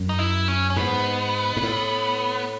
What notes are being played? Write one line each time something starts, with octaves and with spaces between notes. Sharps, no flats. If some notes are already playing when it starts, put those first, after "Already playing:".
Already playing: F#2
D#4
E4
C#4
C#4
G#2 B3
G#2
A2